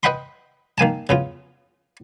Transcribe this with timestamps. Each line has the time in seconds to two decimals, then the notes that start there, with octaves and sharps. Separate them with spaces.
0.03 B4 D#5 F#5 G5 B5 C6
0.78 D#3 A#3 G#5 A5
1.09 C#3 B3 F4